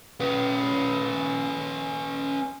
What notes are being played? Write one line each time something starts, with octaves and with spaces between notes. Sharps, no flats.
C#4 B4